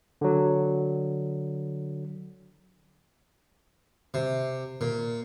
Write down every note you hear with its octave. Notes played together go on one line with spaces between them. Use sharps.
D3 F#3
C3
A#2